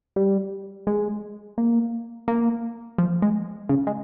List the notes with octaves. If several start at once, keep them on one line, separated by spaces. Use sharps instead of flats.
G3
G#3
A#3
A#3
F3
G#3
C#3
G#3